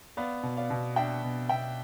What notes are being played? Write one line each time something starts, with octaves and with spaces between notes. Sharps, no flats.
B3 D5 F5
B2
D5 F5
B2
D4 E5 G5
B2
B2 E5 G5